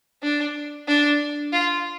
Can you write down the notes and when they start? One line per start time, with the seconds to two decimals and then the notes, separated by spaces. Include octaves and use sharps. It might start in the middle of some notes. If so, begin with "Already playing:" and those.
0.23 D4
0.88 D4
1.53 F4